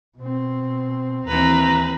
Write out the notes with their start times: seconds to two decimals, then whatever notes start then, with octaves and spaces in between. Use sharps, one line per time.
0.18 B2 C4
1.27 D#2 E3 C4 B4 A#5